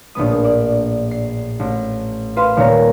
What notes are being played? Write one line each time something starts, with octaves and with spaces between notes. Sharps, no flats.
A#1 A2 B3 D#6
D5 E7
C7
A1
B4 C5 F5 B5 C6
D#1 A#2 F4 C#5 A#5